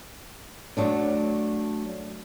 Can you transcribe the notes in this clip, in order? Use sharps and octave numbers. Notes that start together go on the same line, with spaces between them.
F#3 A3 D4